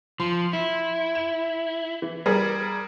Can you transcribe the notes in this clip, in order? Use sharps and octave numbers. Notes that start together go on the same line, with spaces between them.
F3 C6
E4
E7
E3
G3 G#4 A#4